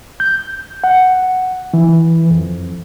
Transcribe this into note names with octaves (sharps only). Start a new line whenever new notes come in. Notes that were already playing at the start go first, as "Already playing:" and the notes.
G6
F#5
E3
F2